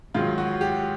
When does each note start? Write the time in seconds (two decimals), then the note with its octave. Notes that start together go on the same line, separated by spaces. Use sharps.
0.14 G#2 D#3 F#3 F4
0.38 F#4
0.61 G4